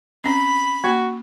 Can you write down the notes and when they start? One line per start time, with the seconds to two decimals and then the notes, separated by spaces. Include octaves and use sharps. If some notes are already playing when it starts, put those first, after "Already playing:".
0.24 C4 C#4 B5
0.84 A#3 F#4